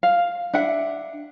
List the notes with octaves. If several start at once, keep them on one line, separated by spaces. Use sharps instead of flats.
F5
D4 E5 F#5